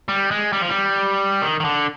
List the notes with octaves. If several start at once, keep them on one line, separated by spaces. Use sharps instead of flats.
G3
G#3
G3
F3
G3
D#3
D#3
D3